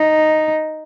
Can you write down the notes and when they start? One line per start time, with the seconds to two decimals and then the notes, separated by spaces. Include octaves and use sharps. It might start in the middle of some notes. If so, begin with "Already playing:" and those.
Already playing: D#4